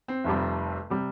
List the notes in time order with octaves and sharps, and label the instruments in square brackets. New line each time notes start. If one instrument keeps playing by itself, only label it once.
[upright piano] C4
F1 F2 C3 G3
C3 G3